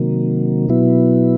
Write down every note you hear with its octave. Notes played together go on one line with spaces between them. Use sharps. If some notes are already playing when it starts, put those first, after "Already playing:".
Already playing: C3 D#3 F#3 A#3
B2 F#3 B3 E4